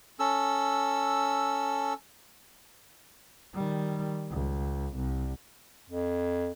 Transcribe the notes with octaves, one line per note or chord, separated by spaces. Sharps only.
C#4 A4 E6
D#3 G3
C#2
C2
F2